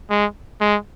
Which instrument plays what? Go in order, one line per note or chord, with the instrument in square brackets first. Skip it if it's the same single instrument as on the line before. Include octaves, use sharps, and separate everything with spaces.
[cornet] G#3
G#3